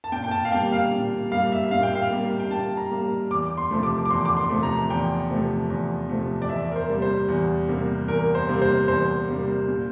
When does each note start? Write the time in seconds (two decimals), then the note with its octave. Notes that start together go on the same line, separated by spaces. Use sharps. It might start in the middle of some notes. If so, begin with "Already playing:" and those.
0.04 A5
0.12 A#2 G5
0.24 G5
0.31 A5
0.45 F5
0.52 G3 A#3 G5
0.72 F5
0.91 A#2
1.32 G3 A#3 F5
1.52 E5
1.71 A#2 F5
1.83 G5
1.95 F5
2.11 G3 A#3
2.40 G5
2.50 A#2 A5
2.77 A#5
2.91 G3 A#3
3.30 E2 D6
3.57 C6
3.71 C3 F3 A3
3.83 D6
4.05 D6
4.10 E2 C6
4.25 D6
4.37 C6
4.50 C3 F3 A3
4.63 A#5
4.90 E2 G5
5.30 C3 F3 A3
5.70 E2
6.09 C3 F3 A3
6.42 D5
6.49 E2 E5
6.71 A#4
6.76 C5
6.89 C3 G3 A#3
7.02 C5
7.29 E2
7.68 C3 G3 A#3
8.08 E2 A#4
8.35 C5
8.49 C3 G3 A#3
8.62 C5
8.88 E2 C5
9.28 C3 G3 A#3
9.68 A#2